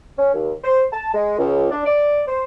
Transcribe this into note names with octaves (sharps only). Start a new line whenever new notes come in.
C#4
D#2
C5
A5
G#3
C#2
D4
D5
C5